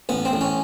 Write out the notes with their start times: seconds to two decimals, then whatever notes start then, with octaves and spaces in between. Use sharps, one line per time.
0.09 A1 B3
0.25 C4
0.33 A1
0.41 C#4